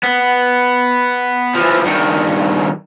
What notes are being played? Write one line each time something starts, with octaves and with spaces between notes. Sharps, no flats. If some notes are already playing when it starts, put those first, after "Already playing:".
B3
E3 F3
G2 D#3